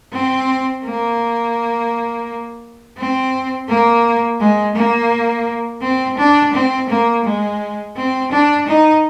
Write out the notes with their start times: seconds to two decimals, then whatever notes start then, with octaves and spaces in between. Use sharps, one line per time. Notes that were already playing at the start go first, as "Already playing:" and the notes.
0.12 C4
0.84 A#3
2.98 C4
3.68 A#3
4.40 G#3
4.76 A#3
5.82 C4
6.18 D4
6.54 C4
6.89 A#3
7.24 G#3
7.97 C4
8.32 D4
8.67 D#4